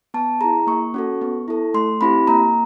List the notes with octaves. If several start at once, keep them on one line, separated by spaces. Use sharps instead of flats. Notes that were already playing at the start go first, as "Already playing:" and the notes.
B3 A5
E4 G#4 A#5
A#3 C#6
C#4 F#4 A4
B3
E4 A4
A3 C6
C4 E4 G4 B5
A#3 A#5